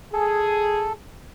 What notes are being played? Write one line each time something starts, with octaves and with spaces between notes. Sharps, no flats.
G#4 A4